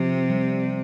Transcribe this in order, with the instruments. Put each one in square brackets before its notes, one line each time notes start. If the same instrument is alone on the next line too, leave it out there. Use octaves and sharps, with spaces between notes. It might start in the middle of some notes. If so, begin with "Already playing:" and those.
Already playing: [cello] C3 [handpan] F3 G4
[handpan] G3